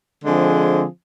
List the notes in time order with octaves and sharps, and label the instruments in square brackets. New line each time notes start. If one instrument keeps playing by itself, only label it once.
[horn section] D3 F3 G#3 C4 G#4